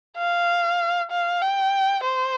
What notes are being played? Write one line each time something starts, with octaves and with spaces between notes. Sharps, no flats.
F5
F5
G5
C5